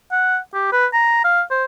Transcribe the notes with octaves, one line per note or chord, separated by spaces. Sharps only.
F#5
G4
B4
A#5
F5
C5